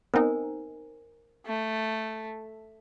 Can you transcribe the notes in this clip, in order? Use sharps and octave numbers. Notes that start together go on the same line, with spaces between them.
B3 C4 D#4 A#4 C5 G#5
A3